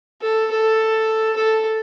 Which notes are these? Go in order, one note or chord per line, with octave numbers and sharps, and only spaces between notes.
A4
A4
A4